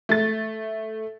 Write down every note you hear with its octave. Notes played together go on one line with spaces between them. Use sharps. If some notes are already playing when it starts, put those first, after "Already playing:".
A3 A6